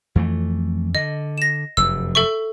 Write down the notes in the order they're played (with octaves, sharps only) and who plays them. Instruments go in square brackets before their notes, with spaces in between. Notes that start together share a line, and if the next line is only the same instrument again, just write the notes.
[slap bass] F2 E3 A3
[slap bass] D3 [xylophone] D#5
[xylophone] A#6 E7
[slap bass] F1 F#2 [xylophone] E6
[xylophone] A4 E5 C#6